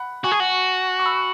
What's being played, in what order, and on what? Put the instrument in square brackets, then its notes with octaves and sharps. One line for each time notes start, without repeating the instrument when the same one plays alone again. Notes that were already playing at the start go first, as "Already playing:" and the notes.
Already playing: [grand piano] F#5 B5
[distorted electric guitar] F#4 [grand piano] G#5 C#6
[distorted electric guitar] G#4
F#4
[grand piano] C#6
B5 E6